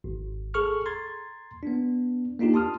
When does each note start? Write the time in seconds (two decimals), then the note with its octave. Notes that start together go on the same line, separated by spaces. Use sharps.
0.04 G#1
0.54 G#4 A4 C#6 F6
0.85 A#5 C6 G#6 A6
1.63 B3 D4
2.39 A#3 D4 D#4 F4 G4
2.54 A5 C6 D#6 F6